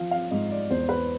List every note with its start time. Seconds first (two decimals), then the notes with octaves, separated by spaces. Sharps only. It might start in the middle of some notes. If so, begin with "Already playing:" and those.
Already playing: F3 F5
0.11 F5
0.31 G#2 D#5
0.51 D5
0.70 E2 C5
0.89 B4